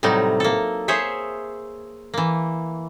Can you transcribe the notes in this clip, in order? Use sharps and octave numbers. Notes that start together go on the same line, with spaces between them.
A2 C3 F#3 G3 D#4
A#3 A4
G#4 C5 C#5 E5
E3 A#3